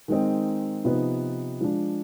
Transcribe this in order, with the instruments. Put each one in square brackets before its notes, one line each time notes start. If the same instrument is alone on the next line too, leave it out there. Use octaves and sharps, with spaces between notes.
[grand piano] D#3 G#3 C4 D#4
C3 F3 B3 D#4 B4
F3 G#3 D4